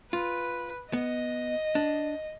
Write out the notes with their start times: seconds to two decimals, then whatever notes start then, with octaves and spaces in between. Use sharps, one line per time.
0.13 F4 B4
0.93 B3 D#5
1.75 D4